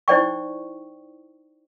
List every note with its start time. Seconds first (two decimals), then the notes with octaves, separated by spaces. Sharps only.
0.08 D#4 E4 C5 D5 G5 C#6